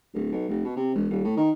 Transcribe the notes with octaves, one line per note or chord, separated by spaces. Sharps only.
D1
B1
F1
B2
C3
E1
D#1
A2
D#3